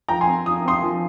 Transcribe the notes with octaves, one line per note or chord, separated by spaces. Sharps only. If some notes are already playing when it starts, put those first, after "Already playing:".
F3 G5 A#5
G#5 C6
C4
F3 D#6
C4 C6 D#6
F3